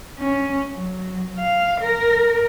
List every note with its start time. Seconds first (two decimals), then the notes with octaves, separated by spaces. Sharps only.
0.19 C#4
0.74 F#3
1.38 F5
1.81 A#4